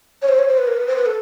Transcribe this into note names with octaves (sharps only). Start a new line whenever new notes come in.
C#5
C5
C#5
C5
B4
A#4
B4
C5
B4
A4